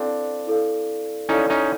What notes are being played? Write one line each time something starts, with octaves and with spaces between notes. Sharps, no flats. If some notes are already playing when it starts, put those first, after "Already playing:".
Already playing: C4 D4 E4 A4 D5 F5
E4 A4 D5 F5
C#4 D#4 E4 A4 D5 F5
C#4 D#4